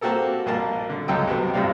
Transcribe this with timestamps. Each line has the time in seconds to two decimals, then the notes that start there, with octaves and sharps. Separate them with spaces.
0.01 A#3 C4 F#4 G4 A4 A#4
0.46 A#1 B2 A#3 A#4 A5
0.89 D3
1.08 C#2 F#2 F#3 A4 D#5 G5
1.27 C3 B3
1.54 G#1 F#2 A2 C3 D5 F5